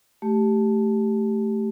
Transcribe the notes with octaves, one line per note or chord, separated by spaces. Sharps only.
A3 G4